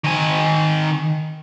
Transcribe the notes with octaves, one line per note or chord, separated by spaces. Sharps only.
D#3 G#5